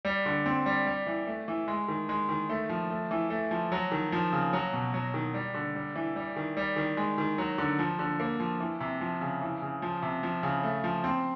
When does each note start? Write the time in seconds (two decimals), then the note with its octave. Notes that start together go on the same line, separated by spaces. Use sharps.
0.05 G3
0.26 D3
0.46 C4
0.66 G3
0.87 G3
1.07 E3
1.27 A3
1.48 E3
1.68 G#3
1.88 D#3
2.09 G#3
2.29 D#3
2.49 A3
2.69 F3
2.90 A3
3.11 E3
3.30 A3
3.51 F3
3.72 F#3
3.92 D#3
4.12 F3
4.33 C#3
4.53 F#3
4.73 B2
4.94 F#3
5.14 D#3
5.34 G3
5.54 D3
5.75 G3
5.95 E3
6.16 G3
6.36 D#3
6.57 G3
6.76 D#3
6.97 G#3
7.18 D#3
7.38 F#3
7.58 D3
7.79 F3
7.99 D3
8.20 A#3
8.40 F3
8.60 E3
8.81 C3
9.01 F3
9.21 C#3
9.41 E3
9.62 C#3
9.82 F3
10.03 C3
10.23 F3
10.43 C#3
10.63 A3
10.84 F3
11.04 C4